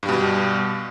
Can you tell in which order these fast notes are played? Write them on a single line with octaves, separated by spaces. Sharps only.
G2 G3 B2